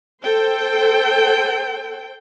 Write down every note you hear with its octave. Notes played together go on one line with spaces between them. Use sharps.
A4 C5 G5